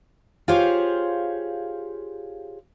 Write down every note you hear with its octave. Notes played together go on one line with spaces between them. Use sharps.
F4 G4 G#4 C5 C#5 F5